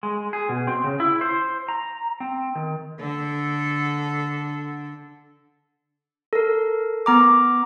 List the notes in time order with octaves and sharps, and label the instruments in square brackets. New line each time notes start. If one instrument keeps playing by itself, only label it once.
[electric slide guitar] G#3
G#4
B2
C4
C#3
E4
C5
A#5
C4
D#3
[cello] D3 A4
[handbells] A4 A#4
B3 A#5 D6